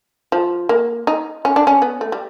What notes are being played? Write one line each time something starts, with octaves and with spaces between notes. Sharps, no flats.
F3
A#3
D#4
C#4
D4
C#4
B3
A3
G3